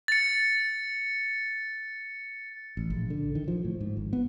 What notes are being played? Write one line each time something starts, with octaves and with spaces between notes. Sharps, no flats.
A6 C#7
A1
A#1
D3
D#3
F3
A2
G#2
G#1
B3